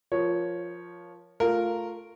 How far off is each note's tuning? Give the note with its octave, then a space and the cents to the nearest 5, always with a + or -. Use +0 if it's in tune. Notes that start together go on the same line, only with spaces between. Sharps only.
F3 +0 A#4 +20 C#5 +0
A3 +5 F4 +0 A#4 -5